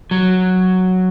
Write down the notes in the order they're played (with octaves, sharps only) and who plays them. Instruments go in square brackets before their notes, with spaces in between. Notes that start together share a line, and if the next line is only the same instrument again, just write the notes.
[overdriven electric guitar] F#3